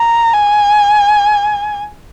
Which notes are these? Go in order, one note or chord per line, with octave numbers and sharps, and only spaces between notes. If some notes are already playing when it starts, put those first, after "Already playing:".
Already playing: A#5
G#5